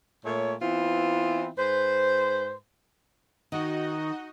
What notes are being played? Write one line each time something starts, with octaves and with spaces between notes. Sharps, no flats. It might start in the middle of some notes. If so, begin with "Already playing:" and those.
A#2 A3 C#5
E3 B3 C4 E4 F4
G#2 B4 C5
D#3 D#4 F#4 D#5